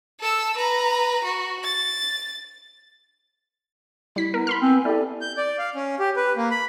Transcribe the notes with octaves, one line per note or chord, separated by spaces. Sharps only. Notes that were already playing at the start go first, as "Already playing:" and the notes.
A4 E6
B4 A#5
F#4
A6
G3 E4 B6
B3 A#4
B5 C6 F6
B3 C4 G#5
E4 G4 A4 D5
G6
D5
F5
C#4
G4
B4
A#3
B5